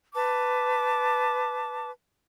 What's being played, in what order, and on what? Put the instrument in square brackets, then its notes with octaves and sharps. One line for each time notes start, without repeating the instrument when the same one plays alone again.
[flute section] B4 A5 D6